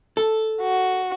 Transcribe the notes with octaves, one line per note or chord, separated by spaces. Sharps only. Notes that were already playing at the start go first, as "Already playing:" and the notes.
A4
F#4